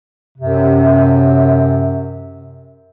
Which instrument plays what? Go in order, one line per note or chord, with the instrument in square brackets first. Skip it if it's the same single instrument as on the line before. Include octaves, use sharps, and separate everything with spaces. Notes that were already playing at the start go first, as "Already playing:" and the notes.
[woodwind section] F#2 C3